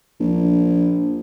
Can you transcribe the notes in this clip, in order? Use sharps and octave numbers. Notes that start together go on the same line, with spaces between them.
A#1